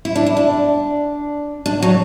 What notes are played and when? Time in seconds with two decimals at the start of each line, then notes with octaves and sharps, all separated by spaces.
0.05 E4
0.16 D4
0.26 E4
0.37 D4
1.66 D4
1.82 F#3